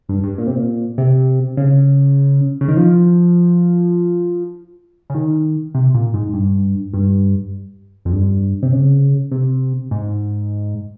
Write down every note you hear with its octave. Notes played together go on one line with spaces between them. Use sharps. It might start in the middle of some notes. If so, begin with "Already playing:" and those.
G2
G2
A#2
C3
A#2
C3
C#3
C#3
D#3
F3
C#3
D#3
C3
A#2
G#2
G2
G2
F2
G2
C3
C#3
C3
G#2